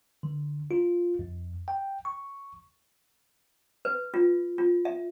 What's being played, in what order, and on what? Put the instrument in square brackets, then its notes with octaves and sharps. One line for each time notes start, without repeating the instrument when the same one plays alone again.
[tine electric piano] D3
F4
F2
G5
C#6
[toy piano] B4
F4
F4
E5